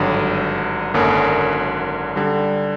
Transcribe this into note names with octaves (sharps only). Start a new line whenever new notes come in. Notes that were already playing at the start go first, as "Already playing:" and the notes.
Already playing: G#1 G2 D3 F#3
G#1 F#2 D3 F#3 A#3
D3 G3